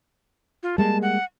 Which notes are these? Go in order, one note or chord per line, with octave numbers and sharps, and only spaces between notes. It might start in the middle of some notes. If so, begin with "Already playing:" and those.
F4
G3 G#3 A#3 A5
F#5